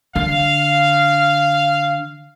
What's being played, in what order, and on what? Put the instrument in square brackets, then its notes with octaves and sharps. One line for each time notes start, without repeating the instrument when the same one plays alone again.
[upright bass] D3 [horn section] F5